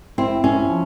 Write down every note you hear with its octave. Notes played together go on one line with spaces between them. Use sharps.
C4 E4
C#4 E4
F3